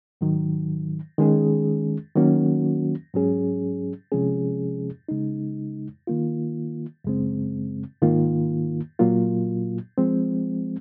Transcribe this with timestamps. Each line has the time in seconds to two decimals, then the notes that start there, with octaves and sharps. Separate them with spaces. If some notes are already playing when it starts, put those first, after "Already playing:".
0.21 G#2 D#3 F#3
1.18 D#3 G#3 C#4 G#4
2.16 D#3 F#3 A#3 C#4 F#4
3.14 G#2 F#3 C#4 G#4
4.12 C3 F3 G#3 C#4 G#4
5.09 C#3 G#3 D#4
6.07 D#3 A#3 F4
7.04 F#2 C#3 G#3 C4
8.02 G#2 D#3 A#3 F4
8.99 A#2 F#3 A#3 F4
9.98 F3 G#3 C4